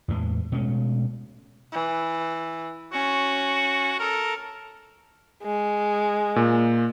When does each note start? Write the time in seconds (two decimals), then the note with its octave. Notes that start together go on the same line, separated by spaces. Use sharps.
0.08 E2 A2 E3 G#3
0.52 B2 G#3 A3 C#4
1.73 E3
2.93 C#4 F#4
4.00 A4 A#4
5.43 G#3
6.36 A#2